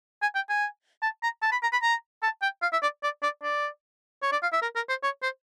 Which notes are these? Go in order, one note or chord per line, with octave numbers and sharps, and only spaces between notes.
G#5
G5
G#5
A5
A#5
A5
B5
A#5
B5
A#5
A5
G5
F5
E5
D5
D5
D5
D5
C#5
D5
F5
E5
A#4
A#4
C5
C#5
C5